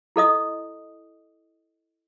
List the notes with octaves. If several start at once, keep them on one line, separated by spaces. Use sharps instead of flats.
E4 A4 D#5 D#6